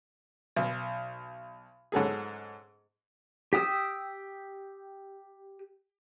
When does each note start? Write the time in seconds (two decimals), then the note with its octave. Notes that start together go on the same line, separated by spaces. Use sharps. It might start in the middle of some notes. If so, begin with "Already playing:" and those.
0.56 B1
1.92 G#2 F#3 A3 G#4
3.53 G4 G5 D#6 E6